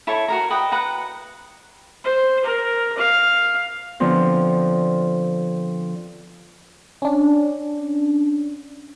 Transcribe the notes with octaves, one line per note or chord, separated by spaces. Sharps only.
E4 A4 C#5 C#6
F#4 A#4 A#5
B4 D#5 G5
B4 F#5 A#5
C5
A#4
F5
D3 F3 B3 C4
C#4 D4